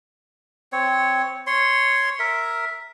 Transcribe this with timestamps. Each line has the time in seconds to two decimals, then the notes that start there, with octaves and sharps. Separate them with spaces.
0.72 C4 C#5
1.47 C#5 C6
2.19 A#4 E5